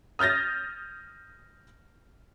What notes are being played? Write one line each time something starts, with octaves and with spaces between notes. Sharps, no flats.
D#6 F6 G6 A6 A#6